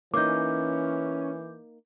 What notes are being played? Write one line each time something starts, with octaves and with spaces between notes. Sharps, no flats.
E3 A#3 C#4 D#4 D6 G6